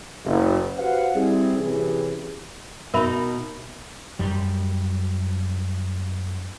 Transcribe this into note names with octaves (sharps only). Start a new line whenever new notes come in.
F#1
F#4 G4 B4 C5 F5 F#5
G3 C4 E4 G#4
C3 E3 C#4 G4 G#4
B2 D#4 A#4 E5 B5
F#2 G3